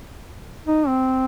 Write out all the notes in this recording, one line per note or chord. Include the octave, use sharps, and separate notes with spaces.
D#4
C4